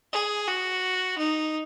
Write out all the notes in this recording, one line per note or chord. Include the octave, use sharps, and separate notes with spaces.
G#4
F#4
D#4